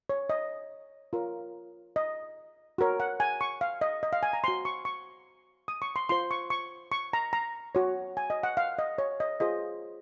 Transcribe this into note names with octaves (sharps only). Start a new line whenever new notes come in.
C#5
D#5
F4 A#4 C#5
D#5
F#4 A#4 C#5
F#5
G#5
C#6
F5
D#5
D#5
F5
G#5
A#5
F#4 C5 C6
C#6
C#6
D#6
C#6
C6
F4 C5 C6
C#6
C#6
C#6
A#5
A#5
F#4 C#5
G#5
D#5
F#5
F5
D#5
C#5
D#5
F4 G#4 C5 D#5